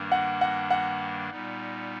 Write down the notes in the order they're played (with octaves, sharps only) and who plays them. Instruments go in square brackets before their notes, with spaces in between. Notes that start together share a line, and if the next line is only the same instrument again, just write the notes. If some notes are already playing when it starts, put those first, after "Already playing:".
Already playing: [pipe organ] G2 D#3 G3 A#3 D4
[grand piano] F#5
F#5
F#5
[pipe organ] A#2 G3 B3 D#4